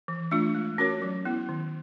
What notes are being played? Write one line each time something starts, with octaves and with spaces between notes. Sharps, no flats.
E3
A3 D4 F4
G#3
C#4 F#4 A#4 C#5
F#3
B3 E4
D#3